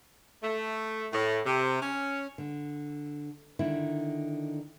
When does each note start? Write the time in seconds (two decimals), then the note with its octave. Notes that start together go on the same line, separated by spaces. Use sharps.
0.43 A3
1.12 A2
1.45 C3
1.82 C#4
2.38 D3
3.59 D3 D#3 E4